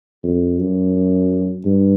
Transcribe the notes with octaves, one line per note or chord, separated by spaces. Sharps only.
F2
F#2
G2